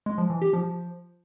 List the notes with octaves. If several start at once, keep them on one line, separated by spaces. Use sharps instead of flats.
G#3
F3
E3
G4
F3